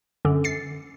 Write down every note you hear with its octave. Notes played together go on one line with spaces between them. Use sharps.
F#2 D3
A6 C7 C#7